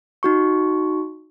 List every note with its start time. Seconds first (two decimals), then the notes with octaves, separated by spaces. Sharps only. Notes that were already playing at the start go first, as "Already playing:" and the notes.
0.23 D#4 F#4 C#6